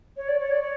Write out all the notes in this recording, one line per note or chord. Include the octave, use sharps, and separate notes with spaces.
C#5
D5
C#5
D5
C#5